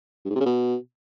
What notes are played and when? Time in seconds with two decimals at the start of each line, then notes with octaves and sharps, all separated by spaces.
0.25 G2
0.30 G#2
0.35 C3
0.40 C#3
0.46 B2